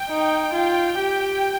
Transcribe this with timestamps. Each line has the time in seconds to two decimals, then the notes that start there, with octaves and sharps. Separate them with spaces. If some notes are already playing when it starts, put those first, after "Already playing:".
Already playing: G5
0.09 D#4
0.54 F4 G5
0.98 G4